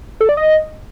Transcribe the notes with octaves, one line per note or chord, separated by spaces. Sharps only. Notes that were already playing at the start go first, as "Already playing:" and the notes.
A4
D5
D#5